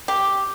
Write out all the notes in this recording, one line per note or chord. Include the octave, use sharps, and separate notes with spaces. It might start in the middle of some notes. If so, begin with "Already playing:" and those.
G4